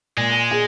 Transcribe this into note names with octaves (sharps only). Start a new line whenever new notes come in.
A#2 G#3
G#4